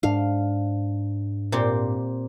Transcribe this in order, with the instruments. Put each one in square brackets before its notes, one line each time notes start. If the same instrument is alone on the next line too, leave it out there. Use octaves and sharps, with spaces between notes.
[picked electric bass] G#2 D4 [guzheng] F5
[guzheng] A#2 C4 G4